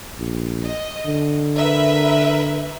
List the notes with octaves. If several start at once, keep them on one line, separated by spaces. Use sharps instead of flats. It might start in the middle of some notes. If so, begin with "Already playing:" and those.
A#1
D#5
D3
A#4 B4 E5